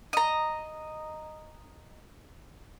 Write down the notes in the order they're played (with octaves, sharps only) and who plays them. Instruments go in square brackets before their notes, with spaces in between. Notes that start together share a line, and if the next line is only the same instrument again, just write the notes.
[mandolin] D#5 A#5